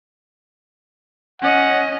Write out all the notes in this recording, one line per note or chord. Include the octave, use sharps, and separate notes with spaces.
C#4 D#5 F#5